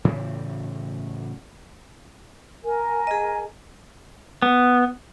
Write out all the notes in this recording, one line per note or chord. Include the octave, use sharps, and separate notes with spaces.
A2 C#3 E3 G3
A#4 G#5
G#4 D#5
B3